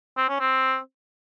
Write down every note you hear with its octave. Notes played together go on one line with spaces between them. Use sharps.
C4
C#4
C4